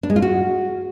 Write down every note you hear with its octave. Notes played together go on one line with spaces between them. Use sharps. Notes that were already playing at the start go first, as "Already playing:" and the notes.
D4
G#3
F4
F#4